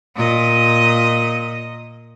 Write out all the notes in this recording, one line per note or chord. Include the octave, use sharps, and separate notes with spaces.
A#2 D#5